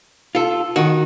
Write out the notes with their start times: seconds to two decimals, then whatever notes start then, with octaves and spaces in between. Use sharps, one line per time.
0.35 F4 A4
0.76 D#3 F#4